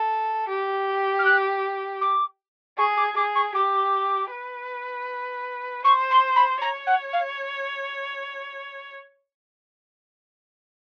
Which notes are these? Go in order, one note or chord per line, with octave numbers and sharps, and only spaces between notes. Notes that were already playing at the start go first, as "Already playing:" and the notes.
Already playing: A4
G4
F6
F#6
D6
G#4 C#6
D6
G#4 D6
C#6
G4 D6
B4
C5 C#6
C6
B5
C#5 A#5
F#5
F5